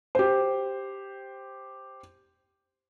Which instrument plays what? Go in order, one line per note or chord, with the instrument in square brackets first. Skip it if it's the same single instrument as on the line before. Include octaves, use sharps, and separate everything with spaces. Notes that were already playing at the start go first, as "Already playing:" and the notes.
[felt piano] G4 C5